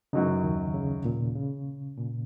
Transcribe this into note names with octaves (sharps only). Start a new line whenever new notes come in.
F#2 C#3 F#3 D#4
D#2 D#3
C#3
A#2
C#3
A#2